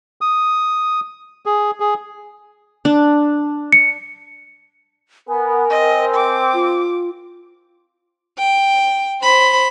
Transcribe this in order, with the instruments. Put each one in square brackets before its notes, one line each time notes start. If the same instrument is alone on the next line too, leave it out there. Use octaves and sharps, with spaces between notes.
[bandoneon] D#6
G#4
G#4
[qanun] D4
[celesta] C#7
[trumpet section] B3 [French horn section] A#4 [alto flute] G#5
[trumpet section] C4 [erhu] D#5
[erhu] D6
[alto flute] F4
[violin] G5
C5 B5